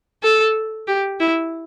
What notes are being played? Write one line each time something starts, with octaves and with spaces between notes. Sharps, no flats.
A4
G4
E4